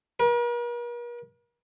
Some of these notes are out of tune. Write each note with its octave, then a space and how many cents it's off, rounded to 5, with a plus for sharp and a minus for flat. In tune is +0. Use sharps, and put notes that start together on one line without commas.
A#4 +45